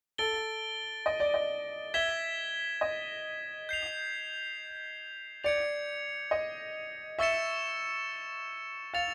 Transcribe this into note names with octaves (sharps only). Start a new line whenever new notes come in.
A4 A6 D7 G7
D#5
D5
D#5
E5 G#6 B6 E7 G7
D#5
G6 C7 F7
D5 G#6 C#7 F7
D#5
E5 C#6 E6 A6 C#7 E7
F5 A6 C#7 F7